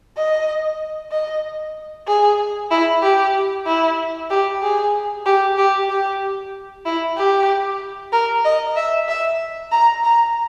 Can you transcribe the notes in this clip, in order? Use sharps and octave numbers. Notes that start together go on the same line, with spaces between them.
D#5
D#5
G#4
E4
G4
E4
G4
G#4
G4
G4
G4
E4
G4
A#4
D#5
E5
E5
A#5
A#5